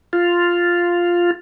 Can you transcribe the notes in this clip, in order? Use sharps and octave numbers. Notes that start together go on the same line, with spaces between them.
F4